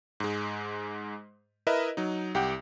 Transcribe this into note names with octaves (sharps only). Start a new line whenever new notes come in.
G#2 G#3
E4 A#4 B4 D#5 E5
F#3 D#4
C2 G4 F#5 G5